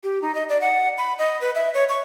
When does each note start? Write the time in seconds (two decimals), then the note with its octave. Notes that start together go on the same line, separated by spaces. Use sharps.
0.03 G4
0.22 D#4
0.35 D#5
0.49 D5
0.61 F#5
0.98 B5
1.18 D#5
1.41 B4
1.55 E5
1.74 C#5
1.89 C#6